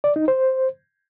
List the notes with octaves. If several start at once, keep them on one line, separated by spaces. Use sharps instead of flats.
D5
D#4
C5